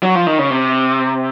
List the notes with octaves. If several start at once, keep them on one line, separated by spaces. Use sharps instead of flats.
F#3
F3
D#3
C#3
C3